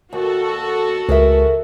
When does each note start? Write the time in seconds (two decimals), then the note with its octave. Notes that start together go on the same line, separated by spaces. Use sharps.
0.13 D#2 F#4 A4
1.09 C#2 G#4 A#4 E5